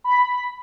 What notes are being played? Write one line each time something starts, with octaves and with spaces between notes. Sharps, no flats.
B5